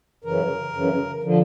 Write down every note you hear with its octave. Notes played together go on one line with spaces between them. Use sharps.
F#2 C#3 E3 A#4
F#2 C#3 E3
D3 F3